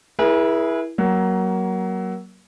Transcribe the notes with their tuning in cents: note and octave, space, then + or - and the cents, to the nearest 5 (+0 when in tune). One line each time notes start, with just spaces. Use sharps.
E4 +0 G#4 +0 B4 -45
F#3 +20 A#3 +20